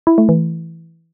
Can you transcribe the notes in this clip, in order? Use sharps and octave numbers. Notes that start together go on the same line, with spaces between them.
E4
A3
E3